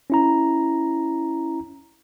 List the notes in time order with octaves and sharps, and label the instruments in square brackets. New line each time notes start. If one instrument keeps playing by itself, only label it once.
[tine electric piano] C#4 E4 A#5